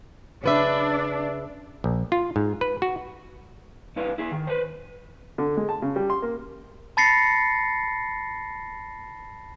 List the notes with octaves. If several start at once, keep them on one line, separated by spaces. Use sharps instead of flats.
C#3 D4 B4 E5
A#1
F4
G#2
B4
F#4
G2 E4 B4 F5
E4 G#4
D#3
B4 C5
D3
G#3
A5
C#3
G3
C6
A#3
A5 B5 A6 A#6 C7 C#7